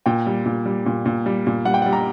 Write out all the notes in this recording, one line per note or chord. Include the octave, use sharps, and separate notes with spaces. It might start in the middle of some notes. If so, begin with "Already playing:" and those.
A#2 G5
G3
A#2
G3
A#2
A#2
G3
A#2
G3 F#5
G5
G3 F#5
A#5